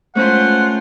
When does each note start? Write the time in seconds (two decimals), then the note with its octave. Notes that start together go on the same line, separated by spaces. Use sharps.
0.15 G#3 A3 C#4 F4 B4 C5 F#5